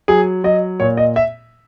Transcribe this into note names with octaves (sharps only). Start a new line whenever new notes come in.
F#3 G#4
F#3 D#5
A#2 C#5
D#5
E5